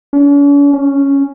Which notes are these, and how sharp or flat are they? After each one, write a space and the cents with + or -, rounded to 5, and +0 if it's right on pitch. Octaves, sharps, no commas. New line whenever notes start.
C#4 +45
C#4 +0